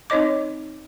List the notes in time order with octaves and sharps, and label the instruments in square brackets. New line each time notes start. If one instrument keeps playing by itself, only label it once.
[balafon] C4 D#4 C#5 D#5 D6